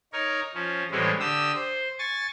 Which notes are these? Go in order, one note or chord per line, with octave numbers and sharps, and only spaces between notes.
D#4 A#4 C#5
F3 C#4
A2 E3 G3 G#3 C4 C#4
D3 G4 D#6 E6
C5
G#5 C#6 A6